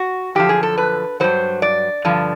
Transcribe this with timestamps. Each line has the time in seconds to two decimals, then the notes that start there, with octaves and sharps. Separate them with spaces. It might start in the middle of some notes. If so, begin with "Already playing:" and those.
Already playing: F#4
0.35 F#2 D3 F3 G4
0.49 G#4
0.63 A4
0.78 B4
1.20 D#3 F#3 C5
1.24 G2
1.62 D5
2.05 G2 D3 F3